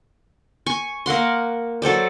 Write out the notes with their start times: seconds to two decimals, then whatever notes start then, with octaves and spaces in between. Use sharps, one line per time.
0.66 G#5 C#6
1.06 A#3 A#4 F#5 C6
1.82 F#3 A4 C5 D5